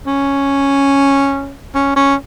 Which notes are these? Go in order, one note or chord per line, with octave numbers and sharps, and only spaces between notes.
C#4
C#4
C#4